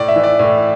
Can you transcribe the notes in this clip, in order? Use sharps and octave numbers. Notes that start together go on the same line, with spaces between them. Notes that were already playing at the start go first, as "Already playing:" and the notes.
Already playing: A2 D5
E5
E3
D5
A2